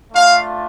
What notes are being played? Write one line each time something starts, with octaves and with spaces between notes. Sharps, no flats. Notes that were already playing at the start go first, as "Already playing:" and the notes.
A3 D4 F4 F5